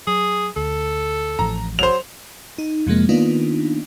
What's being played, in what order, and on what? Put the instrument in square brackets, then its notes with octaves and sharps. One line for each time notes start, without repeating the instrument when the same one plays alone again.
[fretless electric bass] F#3 [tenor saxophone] G#4
[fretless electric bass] D2 [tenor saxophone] A4
[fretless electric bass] A1 A2 F3 [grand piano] A#5
[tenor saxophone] F#3 [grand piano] C5 F7
[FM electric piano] D#4
F2 C3 F3 G#3 A#3
D#3 A#3 B3 D4 D#4 F4